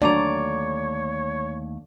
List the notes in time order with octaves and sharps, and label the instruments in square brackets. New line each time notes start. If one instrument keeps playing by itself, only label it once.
[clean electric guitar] D#2 A3 A#5 [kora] D3 F#3 [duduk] C#5 [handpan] D5